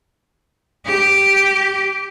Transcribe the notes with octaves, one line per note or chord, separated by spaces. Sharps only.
G4